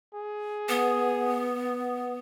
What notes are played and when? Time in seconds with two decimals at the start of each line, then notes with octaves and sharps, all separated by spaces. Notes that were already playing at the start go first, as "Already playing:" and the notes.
0.14 G#4
0.69 B3 B4 F#5 D#6